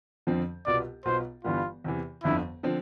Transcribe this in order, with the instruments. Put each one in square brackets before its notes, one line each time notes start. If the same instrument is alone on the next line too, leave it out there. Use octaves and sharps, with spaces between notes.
[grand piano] F2 D3 F3 C4
[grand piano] C2 B2 B3 F4 [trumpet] D5
[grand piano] B1 B2 B3 F4 [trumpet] C5
[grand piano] G1 G2 E3 G3 B3 [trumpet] F4
[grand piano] E2 C3 E3
[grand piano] G1 F2 D3 [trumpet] E4
[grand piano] D3 F3 C4